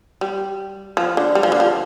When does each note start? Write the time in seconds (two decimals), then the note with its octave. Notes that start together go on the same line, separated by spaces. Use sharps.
0.21 G3
0.97 F3
1.17 D3
1.35 G3
1.43 F3
1.52 D3
1.60 F3